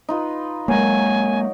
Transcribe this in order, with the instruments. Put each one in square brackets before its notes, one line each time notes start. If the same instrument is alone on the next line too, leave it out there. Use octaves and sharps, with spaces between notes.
[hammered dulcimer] D#4 F4 B4
[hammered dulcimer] F#3 A#4 [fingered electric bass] G#3 A#3 [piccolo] G#5